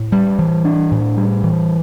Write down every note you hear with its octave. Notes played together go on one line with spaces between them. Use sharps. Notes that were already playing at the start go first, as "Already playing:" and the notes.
Already playing: A2
G3
E3
D4
A2
G3
E3